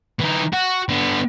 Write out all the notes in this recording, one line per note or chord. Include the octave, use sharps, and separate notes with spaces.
E3 D#4
F#4
D3 B3